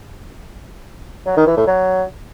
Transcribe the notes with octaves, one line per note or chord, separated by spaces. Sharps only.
F#3
D#3
E3
A2
F#3